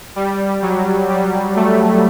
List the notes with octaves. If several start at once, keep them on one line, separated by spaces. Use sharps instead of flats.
G3
F#3
G3
A3